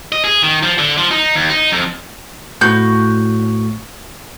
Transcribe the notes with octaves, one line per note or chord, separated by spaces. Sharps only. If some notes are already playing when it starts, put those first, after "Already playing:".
D#5
G#4
D#3
F3
D3
F3
D#4
D#2
D#4
F2
A2 F#4 G6